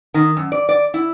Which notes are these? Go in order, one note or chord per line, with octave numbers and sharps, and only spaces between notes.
D#3
F#2
D5
D5
E4